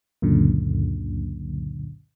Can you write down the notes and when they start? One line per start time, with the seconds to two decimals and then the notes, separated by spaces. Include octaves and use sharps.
0.22 C#2 F#2 A#2 D3